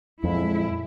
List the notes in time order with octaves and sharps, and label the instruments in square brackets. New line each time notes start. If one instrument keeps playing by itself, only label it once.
[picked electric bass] F2 [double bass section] A#2 F#3 G#3 [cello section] E4